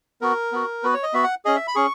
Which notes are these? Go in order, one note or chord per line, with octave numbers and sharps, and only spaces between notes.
B3 F#4 A#4
B3 F#4
B3 F#4 B4
C#5
D#5
B3 F#4 E5
F#5
C#4 G#4 D#5
E5
B5
C#4 G#4 C#6